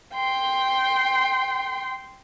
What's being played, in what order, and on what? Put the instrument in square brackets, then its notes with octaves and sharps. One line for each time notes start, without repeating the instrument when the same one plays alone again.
[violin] G5 C6